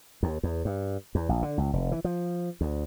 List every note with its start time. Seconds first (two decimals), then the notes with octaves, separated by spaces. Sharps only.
0.23 D#2
0.43 E2
0.65 G2
1.15 E2
1.29 A#1
1.42 D3
1.58 C#2
1.73 F1
1.92 E3
2.04 F3
2.61 D2